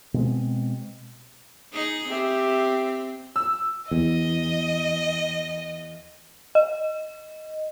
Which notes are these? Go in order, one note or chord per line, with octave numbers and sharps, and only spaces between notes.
B2 G#3 C4
D#4 G#4
C4 G4 E5
E6
E2 D#5
D#5